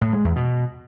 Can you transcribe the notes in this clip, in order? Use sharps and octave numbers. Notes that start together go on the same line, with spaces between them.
A2
G#3
E2
B2